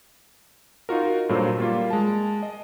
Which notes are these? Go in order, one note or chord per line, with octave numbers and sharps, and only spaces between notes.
D#4 F4 F#4 A#4
G2 A#2 F#3 A4 C5
G3 A#3 F4
G#3 A5
D#5